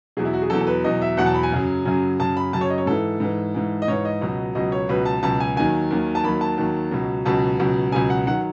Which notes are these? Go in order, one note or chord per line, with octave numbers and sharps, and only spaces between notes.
E2 B2 F#3 G#4
E4
F#4
G#4
E2 B2 F#3 A4
A4
B4
E2 B2 F#3 D#5
E5
E2 B2 F#3 F#5
A5
B5
G#5
F#2 C#3 F#3
F#2 C#3 F#3
F#2 C#3 F#3 A5
B5
F#2 C#3 F#3 A5
C#5
D#5
C#5
G#2 E3 A4
G#2 E3
G#2 E3
D#5
G#2 E3 C#5
D#5
C#2 B2 F#3
C#2 B2 F#3 D#5
C#5
C#2 B2 F#3 B4
A5
C#2 B2 F#3 A5
G#5
D#2 D#3 F#3 G#5
D#2 D#3 F#3
A5
D#2 D#3 F#3 B5
A5
D#2 D#3 F#3
C#2 B2 F#3
C#2 B2 F#3 A5
C#2 B2 F#3
C#2 B2 F#3 G#5
F#5
D#3 F#3 F#5